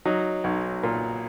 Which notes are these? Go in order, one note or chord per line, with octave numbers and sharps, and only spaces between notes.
F#3 D#4
B1
A#2